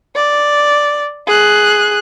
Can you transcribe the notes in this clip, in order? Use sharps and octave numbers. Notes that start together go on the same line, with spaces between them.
D5
G#4 F#6